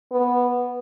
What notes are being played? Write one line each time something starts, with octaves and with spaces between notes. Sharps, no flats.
B3